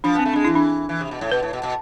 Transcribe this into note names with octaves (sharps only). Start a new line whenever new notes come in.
F3 D4
B3 C4
A3
G#3 D4
E3 E4
D4
E3
C3
B2
A2
B2 B4
A2
B2
B2